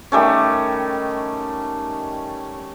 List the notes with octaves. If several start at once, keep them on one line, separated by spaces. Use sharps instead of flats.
D#3 G3 A3 C#4